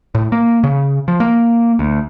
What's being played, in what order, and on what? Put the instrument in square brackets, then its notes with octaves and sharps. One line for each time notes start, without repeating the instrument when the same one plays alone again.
[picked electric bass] A2
A#3
C#3
F3
A#3
D2